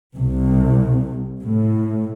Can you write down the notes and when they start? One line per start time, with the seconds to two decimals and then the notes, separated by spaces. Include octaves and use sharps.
0.14 C2
1.41 A2